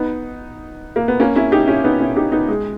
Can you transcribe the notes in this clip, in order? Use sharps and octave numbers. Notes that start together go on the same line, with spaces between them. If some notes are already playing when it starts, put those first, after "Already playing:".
Already playing: B3 D#4
A#3
B3
A#3 C#4
C#4 E4
D#4 G4
C#4 E4
B3 D#4
C#4 E4
D#4 G4
B3 D#4
G#3